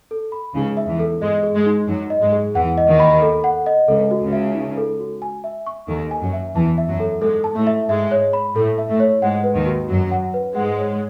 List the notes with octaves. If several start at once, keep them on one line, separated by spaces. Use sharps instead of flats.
A4
B5
C#2 C#3 D#4
E5
E2 E3
A4
G#2 G#3 D#5
G#4
G#2 G#3
D#4
F#2 F#3 D#4
D#5
G#2 G#3
G#4
E2 E3 F#5
D#5
D#2 D#3
B5
A4
F#5
D#5
C#2 C#3 A4
F#4
C#2 C#3
E5
D#4
A4
F#4
G#5
E5
C#6
D#2 D#3 A4
G#5
F#2 F#3
E5
E2 E3 A5
E5
F#2 F#3
A4
G#2 G#3 A4
A5
A2 A3
E5
G#2 G#3 E5
C#5
B5
A2 A3 A4
E5
A2 A3
C#5
G#2 G#3 F#5
B4
D#2 D#3
F#4
F#2 F#3 F#4
F#5
B4
G#2 G#3 F#5
C#5